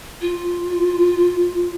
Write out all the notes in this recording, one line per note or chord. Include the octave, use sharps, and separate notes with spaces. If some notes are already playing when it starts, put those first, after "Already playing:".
F4